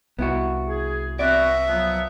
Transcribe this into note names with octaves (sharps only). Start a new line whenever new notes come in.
C2 B3 E4 F#4
G#4
B3 C4 F#4 D5 E5
F3 F#3 B3